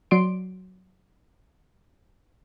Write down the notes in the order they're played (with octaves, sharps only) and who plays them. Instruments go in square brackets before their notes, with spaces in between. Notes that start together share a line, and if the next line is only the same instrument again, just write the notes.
[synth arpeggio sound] F#3 D5 C6 D7